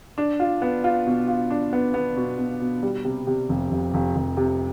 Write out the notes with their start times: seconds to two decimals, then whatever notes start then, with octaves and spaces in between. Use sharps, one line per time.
0.18 D4
0.40 F4
0.62 B3
0.84 F4
1.07 B2
1.28 F4
1.50 D4
1.73 B3
1.94 B3
2.17 B2
2.38 B2
2.61 B2
2.83 G3
3.05 C3
3.27 C3
3.49 F1
3.71 F1
3.94 F1
4.16 F1
4.37 C3